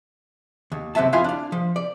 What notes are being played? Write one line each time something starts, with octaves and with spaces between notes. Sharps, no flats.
D#2
F#2 C3 F#3 E5 A5
F2 E4 F4 F5 G#5 C6
D4 F5
F3
D5